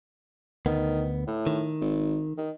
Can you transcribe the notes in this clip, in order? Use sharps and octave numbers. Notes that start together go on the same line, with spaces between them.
D2 D#3 B3
A2
D#3
G#1
D#3